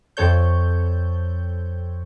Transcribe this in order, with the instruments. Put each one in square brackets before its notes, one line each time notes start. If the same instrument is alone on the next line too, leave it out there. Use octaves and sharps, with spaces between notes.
[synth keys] F2 C4 A4 C#5 G6